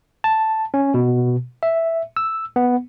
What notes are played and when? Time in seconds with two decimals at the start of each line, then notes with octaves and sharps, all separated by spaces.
0.24 A5
0.74 C#4
0.94 B2
1.63 E5
2.17 E6
2.56 B3